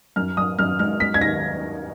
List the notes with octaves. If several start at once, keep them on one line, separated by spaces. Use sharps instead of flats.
F#2 F6
F#2 D#6
F#2 F6
G#3 F6
G#3 B6
G#6
D#2 A#6